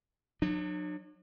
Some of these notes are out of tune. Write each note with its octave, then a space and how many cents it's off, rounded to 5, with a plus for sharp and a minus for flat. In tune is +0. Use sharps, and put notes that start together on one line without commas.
F#3 -25 D4 +40